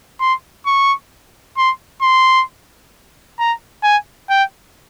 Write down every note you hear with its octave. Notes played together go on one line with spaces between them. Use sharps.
C6
C#6
C6
C6
A#5
G#5
G5